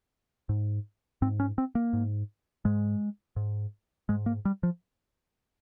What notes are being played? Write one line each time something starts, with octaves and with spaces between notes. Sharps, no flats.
G#2
G#2 C4
C#4
C4
A#3
G#2
G#2 G#3
G#2
G#2 G#3
A#3
G3
F3